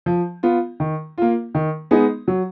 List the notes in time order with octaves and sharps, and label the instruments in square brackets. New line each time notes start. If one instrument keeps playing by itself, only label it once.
[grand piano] F3
B3 F4
D#3
A#3 F4
D#3
G#3 B3 D#4 G#4
F#3